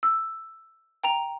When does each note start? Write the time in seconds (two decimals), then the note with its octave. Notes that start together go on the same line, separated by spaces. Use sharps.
0.03 E6
1.04 G5 A#5 F7